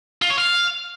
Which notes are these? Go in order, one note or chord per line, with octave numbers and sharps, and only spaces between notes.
F4
C#5
F5